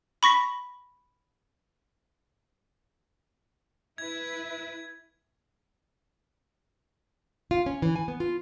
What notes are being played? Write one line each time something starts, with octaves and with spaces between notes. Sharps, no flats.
B5 C#6 A#6 B6
E4 B4 G#6
F4
C#4
E3
G#5
B3
F4